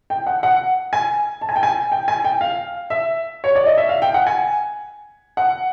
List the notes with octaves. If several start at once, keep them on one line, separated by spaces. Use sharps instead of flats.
G5
F#5
F#5
G#5
A5
G#5
G5
G#5
G5
G#5
G5
F5
E5
C#5
D5
D#5
E5
F5
G5
F#5
G#5
F#5